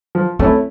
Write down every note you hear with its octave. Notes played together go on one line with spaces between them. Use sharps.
F3
A3 C4 C#4 E4